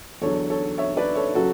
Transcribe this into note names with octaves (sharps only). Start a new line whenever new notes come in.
E2 D3 F#3 A4 C#5
A4 C#5
C#5 E5
B4 D5
A4 C#5
C#3 F#3 F#4 A4